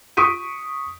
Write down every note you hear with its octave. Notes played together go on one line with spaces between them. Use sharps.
C#6 D#6 B6 D7 D#7